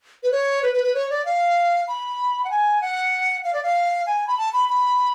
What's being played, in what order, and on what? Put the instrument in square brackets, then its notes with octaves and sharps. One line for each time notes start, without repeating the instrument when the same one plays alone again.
[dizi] B4
C#5
B4
B4
B4
C#5
D5
F5
B5
F#5
G#5
F#5
F5
D5
F5
G#5
B5
A5
B5
B5